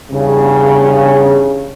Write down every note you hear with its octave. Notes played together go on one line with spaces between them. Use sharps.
E2 G2 C#3